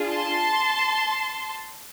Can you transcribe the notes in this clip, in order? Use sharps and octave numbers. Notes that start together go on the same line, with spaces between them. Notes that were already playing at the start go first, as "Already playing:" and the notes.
Already playing: D4 F4 G#4
A5 C6